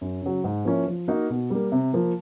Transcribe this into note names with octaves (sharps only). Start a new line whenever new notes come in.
F#2
C#3 F#3
G#2
F3 A#3 C#4 E4
F3
A#3 D#4 F#4 A#4
B2
G3 A#3
C3
F3 A#3